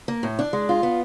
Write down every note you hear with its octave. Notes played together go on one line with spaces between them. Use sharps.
A#3
A2
D4
G#3
F4
B3